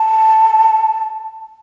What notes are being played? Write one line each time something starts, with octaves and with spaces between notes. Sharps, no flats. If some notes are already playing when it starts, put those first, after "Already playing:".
Already playing: A5